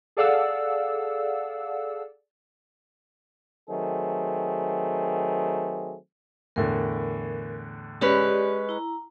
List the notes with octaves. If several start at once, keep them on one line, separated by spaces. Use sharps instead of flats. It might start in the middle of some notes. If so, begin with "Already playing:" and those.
G#4 A4 D5 F5 F#5 E6
D#3 F#3 A3 C4 G#4
E2 A2 D3 A#4
G#3 C#4 G4 B4 D5
E4 A#5